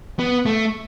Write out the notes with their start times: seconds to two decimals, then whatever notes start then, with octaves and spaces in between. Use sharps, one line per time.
0.19 B3
0.46 A3